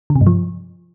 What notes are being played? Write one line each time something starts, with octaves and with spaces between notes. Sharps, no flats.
D3
C3
G2
F3